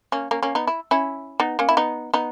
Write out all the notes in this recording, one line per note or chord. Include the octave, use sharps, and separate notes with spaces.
A#3 C#4
A#3 C#4
A#3 C#4
B3 D#4
E4
C#4 E4
B3 D#4
A#3 C#4
E4
B3 D#4
B3 D#4